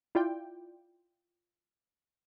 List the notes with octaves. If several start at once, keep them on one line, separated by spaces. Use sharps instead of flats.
E4 F4 D5 G5